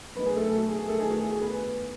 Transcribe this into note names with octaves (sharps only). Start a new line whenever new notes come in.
B2 F#3 A3 B3 D#4 B4
G#4
A3 A4
A3 A4
F#4
G#4
G#4
A3 A4
E2 D#3 A3 D#4 G#4
F#4
G#4
G#4
B3 B4